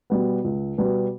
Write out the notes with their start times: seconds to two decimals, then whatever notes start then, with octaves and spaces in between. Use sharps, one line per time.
0.10 B2 G3 B3
0.44 C#2
0.78 B2 G3 B3